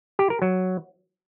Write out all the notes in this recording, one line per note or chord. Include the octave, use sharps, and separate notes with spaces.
G4
A#4
F#3